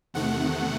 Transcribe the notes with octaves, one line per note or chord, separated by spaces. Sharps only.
E2 C3 D#3 A3 F#5